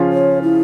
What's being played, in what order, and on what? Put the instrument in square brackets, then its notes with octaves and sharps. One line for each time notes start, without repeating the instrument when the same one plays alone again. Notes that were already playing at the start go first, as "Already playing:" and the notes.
Already playing: [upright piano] C#3 F3 C#4 F4
[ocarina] C#5
E4